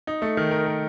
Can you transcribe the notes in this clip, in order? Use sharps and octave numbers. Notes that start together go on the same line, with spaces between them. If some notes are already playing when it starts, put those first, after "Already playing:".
D#4
A3
D#3
A#4
A#4